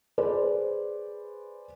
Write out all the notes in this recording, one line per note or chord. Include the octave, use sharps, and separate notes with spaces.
G#4 B4 C5 D5